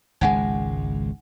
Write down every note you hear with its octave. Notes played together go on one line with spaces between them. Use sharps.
G#1 C#2 G#3 D#4 F#5 G#5